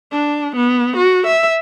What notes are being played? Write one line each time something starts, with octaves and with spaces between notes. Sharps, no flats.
D4
B3
F#4
E5